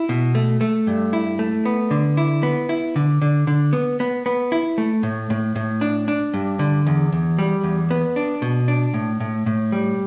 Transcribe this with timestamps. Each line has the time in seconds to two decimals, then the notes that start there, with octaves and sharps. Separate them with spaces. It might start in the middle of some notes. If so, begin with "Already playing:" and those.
Already playing: E4
0.09 B2
0.35 A3
0.61 A3
0.87 G2
1.13 E4
1.39 A3
1.65 B3
1.91 D3
2.17 E4
2.43 B3
2.69 E4
2.96 D3
3.22 D3
3.47 D3
3.73 B3
4.00 B3
4.26 B3
4.52 E4
4.78 A3
5.03 A2
5.30 A2
5.55 A2
5.81 D4
6.08 D4
6.34 G2
6.59 D3
6.87 E2
7.13 E2
7.39 G3
7.63 E2
7.91 B3
8.16 D4
8.42 B2
8.68 D4
8.94 A2
9.20 A2
9.46 A2
9.72 G3